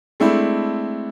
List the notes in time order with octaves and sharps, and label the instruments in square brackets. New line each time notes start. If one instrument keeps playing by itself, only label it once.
[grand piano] G#3 A3 C4 D4 E4